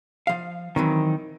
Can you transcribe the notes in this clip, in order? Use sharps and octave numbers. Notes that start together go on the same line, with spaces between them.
F3 F5
D#3 E3 F#3 C4